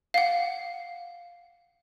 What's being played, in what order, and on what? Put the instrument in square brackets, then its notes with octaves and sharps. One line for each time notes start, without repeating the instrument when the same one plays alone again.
[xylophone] F5 F#5